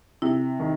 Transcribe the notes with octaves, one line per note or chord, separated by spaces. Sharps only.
C3 E4
D#3